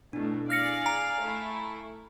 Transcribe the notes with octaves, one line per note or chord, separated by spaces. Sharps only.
B2 A3 D4 E4
G#4 D5 F5 F6 A#6 C#7
G#5 A#5 C7 D7
A3 E4